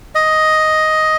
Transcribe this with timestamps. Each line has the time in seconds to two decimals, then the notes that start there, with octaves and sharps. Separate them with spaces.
0.15 D#5